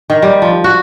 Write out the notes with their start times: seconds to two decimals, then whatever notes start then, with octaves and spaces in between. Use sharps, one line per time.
0.10 D#3
0.22 G3
0.42 F3
0.64 F#4